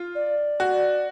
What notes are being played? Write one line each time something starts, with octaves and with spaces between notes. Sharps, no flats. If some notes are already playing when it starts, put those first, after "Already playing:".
Already playing: F4
D5
F#4